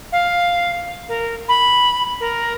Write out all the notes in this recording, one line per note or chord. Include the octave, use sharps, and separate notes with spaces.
F5
A#4
B5
A#4